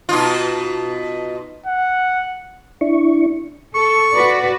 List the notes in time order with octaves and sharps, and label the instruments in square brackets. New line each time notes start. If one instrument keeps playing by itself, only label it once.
[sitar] B2 D#4 F4
[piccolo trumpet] F#5
[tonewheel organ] D4 E4 C#6
[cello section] A4 [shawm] C#6
[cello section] F#4 B4 D5